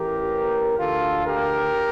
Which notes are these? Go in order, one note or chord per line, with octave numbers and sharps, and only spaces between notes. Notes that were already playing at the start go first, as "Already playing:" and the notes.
Already playing: A1 A2 E3 G4 A#4
D2 D3 F4 A4
G4 A#4